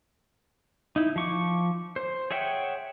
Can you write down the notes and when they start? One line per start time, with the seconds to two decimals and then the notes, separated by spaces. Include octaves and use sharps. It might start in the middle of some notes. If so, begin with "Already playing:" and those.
0.96 D#4 E4
1.16 F3 C#6 D6
1.96 C5
2.31 G#4 C#5 E5 F#5 G5